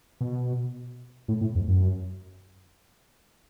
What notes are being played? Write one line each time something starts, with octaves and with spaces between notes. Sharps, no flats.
B2
A2
A2
F2
F#2